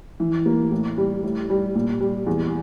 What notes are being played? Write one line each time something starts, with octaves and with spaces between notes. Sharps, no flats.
E3
A#3
A2
G3
A2
G3
A#2
G3
E2